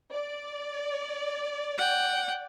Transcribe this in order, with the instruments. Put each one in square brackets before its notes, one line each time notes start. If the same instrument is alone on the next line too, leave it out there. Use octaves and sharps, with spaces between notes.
[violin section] D5
[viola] F#5 G5